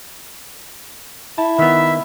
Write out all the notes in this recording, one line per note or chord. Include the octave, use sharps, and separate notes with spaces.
E4 A5
D#3 B3 E5